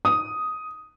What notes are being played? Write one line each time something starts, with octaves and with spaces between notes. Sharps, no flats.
D#6